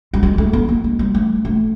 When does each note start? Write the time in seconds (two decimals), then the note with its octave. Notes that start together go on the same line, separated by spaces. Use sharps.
0.14 G3
0.23 G#3
0.38 A3
0.53 B3
0.68 A#3
0.84 G#3
0.99 G3
1.15 A3
1.45 A3